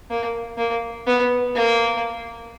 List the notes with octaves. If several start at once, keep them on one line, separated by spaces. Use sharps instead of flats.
A#3
A#3
B3
A#3